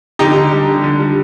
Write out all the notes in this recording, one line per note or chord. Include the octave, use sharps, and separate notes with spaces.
D3 D#4 G4
D3
G3
D3
D3
G3